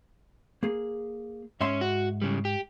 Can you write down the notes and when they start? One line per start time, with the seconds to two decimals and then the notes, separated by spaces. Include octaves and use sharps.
0.63 A#3 G#4
1.61 G#2 C#4 E5 C6
1.81 F#4
2.22 C#3 G3
2.45 G4